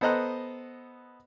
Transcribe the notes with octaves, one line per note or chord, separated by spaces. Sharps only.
B3 A4 C5 D#5 A#5 F#6